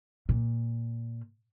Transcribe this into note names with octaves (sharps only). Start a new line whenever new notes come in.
A#2